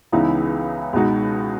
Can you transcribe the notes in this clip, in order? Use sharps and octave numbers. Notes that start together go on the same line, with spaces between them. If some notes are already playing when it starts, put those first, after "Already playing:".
C#2 C#3 E3 B3 D#4
C#2 B2 G#3 D#4 F#4